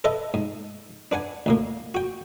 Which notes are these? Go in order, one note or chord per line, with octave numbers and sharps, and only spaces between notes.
A4 B4 D#5 E5 A5 B5
G#2
D4 B4 F#5 G#5
D2 A2 A#3
F#4 G5